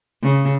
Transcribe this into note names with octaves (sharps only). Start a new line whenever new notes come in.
C#3